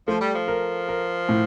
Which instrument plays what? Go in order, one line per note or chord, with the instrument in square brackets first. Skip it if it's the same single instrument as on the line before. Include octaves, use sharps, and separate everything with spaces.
[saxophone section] F3 [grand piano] A3
[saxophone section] G3
F3
[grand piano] A#4
A#4
A2